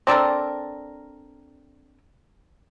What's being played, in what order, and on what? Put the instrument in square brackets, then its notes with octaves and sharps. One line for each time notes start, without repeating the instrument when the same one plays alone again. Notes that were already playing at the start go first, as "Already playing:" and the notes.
[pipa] C4 D4 A4 A#4